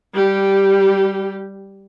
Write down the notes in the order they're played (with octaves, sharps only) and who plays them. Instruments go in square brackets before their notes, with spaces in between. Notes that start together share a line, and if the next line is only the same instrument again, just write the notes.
[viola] G3 G4